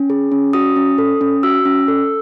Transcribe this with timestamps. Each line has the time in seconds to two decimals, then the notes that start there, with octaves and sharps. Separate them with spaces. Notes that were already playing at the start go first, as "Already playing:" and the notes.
Already playing: C#4
0.10 G#4
0.32 C#4
0.53 F#4 D#6
0.76 C#4
0.98 A4
1.21 C#4
1.43 F#4 E6
1.65 C#4
1.88 A4